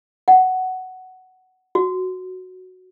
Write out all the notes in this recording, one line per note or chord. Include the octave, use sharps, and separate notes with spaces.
F#5
F#4